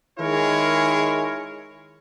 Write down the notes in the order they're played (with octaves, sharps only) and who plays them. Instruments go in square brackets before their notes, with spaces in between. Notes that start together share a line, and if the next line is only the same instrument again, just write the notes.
[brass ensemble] D#3 G#3 E4 G#4 A#4 C#5